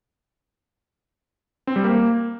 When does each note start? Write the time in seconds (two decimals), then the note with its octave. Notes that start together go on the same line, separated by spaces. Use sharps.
1.67 C4
1.76 G3
1.84 A#3